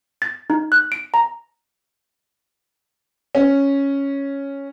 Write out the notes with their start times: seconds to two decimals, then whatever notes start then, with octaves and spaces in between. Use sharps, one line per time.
0.22 A6
0.50 D#4
0.72 F#6
0.92 D7
1.14 A#5
3.35 C#4